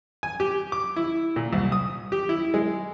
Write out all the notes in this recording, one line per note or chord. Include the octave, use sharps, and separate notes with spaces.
G#5
G4
D6
E4
A#2
C2
D#6
G4
E4
G#3